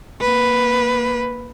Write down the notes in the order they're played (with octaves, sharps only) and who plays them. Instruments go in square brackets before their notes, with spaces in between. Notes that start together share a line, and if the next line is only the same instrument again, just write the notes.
[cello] A#3 B4